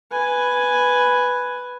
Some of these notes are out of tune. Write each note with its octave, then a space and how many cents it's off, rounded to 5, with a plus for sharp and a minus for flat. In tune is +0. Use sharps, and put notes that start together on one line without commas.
B4 +0 G#5 +0